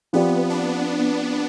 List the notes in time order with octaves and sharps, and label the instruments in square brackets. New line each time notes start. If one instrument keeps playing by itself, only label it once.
[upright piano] F3 C4 G4 D5 [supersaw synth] B3
[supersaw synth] D4